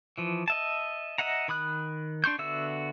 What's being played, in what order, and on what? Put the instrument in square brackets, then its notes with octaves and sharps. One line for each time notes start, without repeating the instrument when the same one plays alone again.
[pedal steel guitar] E3 F3
D#5 E5 A5
D#5 E5 F#5 A#5
D#3 B5 D#6 F#6
D4 C6 C#6 G6
D3 B3 F#4 E5 E6